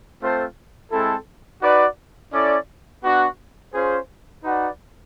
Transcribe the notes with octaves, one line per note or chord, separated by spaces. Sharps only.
A3 C4 F4 A4 C5
G#3 C4 E4 A4
D#4 F#4 B4 D5
C#4 E4 A4 D5
B3 D4 F#4
C#4 F4 G#4 C5
D#4 F#4 B4 D5 F#5